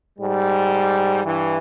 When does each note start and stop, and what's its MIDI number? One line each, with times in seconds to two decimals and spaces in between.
0.19 1.21 44
0.19 1.21 55
1.24 1.58 43
1.24 1.58 52